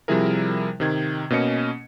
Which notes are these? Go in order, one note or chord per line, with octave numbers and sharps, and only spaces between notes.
C3 F3 G3 E4 G#4 A#4
C3 D#3 G#6
B2 A#3 C#4 D#5 C#7